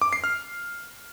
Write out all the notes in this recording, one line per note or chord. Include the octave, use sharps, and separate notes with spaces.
D6
C7
F6